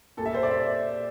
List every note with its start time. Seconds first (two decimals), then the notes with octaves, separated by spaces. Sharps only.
0.17 A#2 A4
0.22 G3 E5
0.34 C5
0.43 D5
0.51 E5